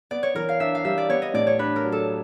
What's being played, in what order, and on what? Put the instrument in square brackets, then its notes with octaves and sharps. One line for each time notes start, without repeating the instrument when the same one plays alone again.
[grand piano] B3 [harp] D5
[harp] C#5
[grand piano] E3 [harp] A#4
[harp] F5
[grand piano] D4 [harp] E5
[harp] F5
[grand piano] G3 [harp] E5
[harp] D5
[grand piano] B3 [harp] C#5
[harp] D#5
[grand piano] A2 [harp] D5
[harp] C#5
[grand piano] D4 [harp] B4
[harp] A#4
[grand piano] F#3
[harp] A4